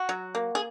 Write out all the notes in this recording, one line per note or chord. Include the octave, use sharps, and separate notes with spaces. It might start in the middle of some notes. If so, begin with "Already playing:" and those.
Already playing: F#4
F#3
A#3
G#4